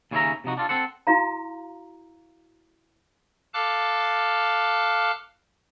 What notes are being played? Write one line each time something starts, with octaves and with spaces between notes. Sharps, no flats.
D#2 C#3 C#4 E4 E5 A#5
C3 F3 D#4 F#4
D4 F4 A4
C4 A4 C5 F#5
E4 F#4 F5 A#5
A4 F5 A5 D6 F6 F#6